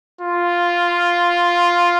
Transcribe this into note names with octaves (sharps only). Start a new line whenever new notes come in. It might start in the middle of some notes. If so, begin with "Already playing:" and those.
F4